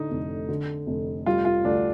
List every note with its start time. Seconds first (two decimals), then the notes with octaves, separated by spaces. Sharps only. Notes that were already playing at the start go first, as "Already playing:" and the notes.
Already playing: A2 D3 D#4
0.11 F1
0.49 D3
0.87 F1
1.26 G3 F4
1.45 F4
1.64 D2 D4